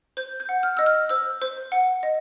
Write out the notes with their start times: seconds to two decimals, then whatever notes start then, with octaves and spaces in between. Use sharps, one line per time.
0.17 C5 G6
0.40 G6
0.49 F#5
0.63 F6
0.77 D#5 E6
0.86 F6
1.09 C5 E6
1.42 C5
1.72 F#5
2.03 D#5